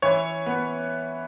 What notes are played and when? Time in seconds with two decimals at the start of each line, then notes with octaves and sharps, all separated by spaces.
0.02 E3 C#5
0.46 B3